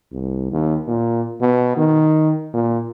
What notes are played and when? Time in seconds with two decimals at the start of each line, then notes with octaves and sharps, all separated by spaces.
0.12 C2
0.52 D#2
0.87 A#2
1.41 B2
1.77 D#3
2.54 A#2